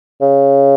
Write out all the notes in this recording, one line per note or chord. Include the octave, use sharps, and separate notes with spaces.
C#3